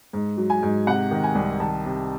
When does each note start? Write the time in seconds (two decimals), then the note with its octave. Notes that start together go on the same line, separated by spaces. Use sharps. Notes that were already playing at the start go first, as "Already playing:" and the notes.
0.13 G#2
0.37 F#3
0.50 G#5
0.62 G#2
0.87 C3 F#5
1.11 D#3
1.24 G#5
1.35 C2
1.60 D#3 A5
1.85 C3